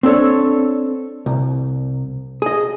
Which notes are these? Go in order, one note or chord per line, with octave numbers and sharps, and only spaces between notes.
C4 D4 A4 C#5
C2
G#4 D#5